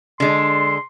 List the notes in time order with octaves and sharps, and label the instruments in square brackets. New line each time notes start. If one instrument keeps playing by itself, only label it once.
[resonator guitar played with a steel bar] D3 G#3 D4 [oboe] C6